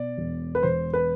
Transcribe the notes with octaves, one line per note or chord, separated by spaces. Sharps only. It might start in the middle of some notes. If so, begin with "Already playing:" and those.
Already playing: B2 D5
E1
B4
E1 C5
B4